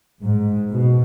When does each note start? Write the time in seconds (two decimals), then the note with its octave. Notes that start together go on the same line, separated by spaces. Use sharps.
0.22 G#2
0.71 B2